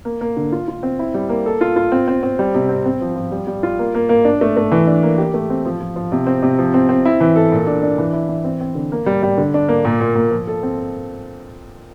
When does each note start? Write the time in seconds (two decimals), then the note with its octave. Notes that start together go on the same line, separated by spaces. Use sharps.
0.05 A#3
0.21 A#3
0.37 D3
0.52 F4
0.68 F4
0.83 C4
0.99 E4
1.14 G3
1.29 A#3
1.46 A4
1.61 F4
1.76 F4
1.92 C4
2.08 C4
2.23 C4
2.39 G3
2.54 C3
2.69 C4
2.85 C4
3.01 F3
3.16 F3
3.31 G3
3.47 G3
3.63 F4
3.79 A#3
3.95 A#3
4.09 A#3
4.25 D4
4.41 A3
4.57 A3
4.72 E3
4.87 D4
5.03 A#3
5.18 G4
5.34 A3
5.50 C4
5.65 F3
5.80 F3
5.96 F3
6.12 C3
6.27 C4
6.43 C3
6.58 F3
6.74 C4
6.89 C4
7.05 E4
7.20 E3
7.36 A4
7.52 A#2
7.67 D4
7.83 D4
7.98 E3
8.13 E4
8.29 E3
8.44 C4
8.60 C4
8.75 D3
8.92 A#3
9.06 G3
9.23 G3
9.38 D3
9.54 D4
9.69 A#3
9.85 A#2
10.00 A#2
10.15 A#2
10.31 F3
10.47 A4
10.63 C4